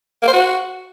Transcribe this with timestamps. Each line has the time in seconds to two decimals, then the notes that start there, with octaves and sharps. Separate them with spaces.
0.23 A#3
0.28 C5
0.33 F#4